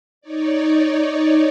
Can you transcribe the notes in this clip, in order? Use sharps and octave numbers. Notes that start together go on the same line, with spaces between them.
D#4 C#5 D5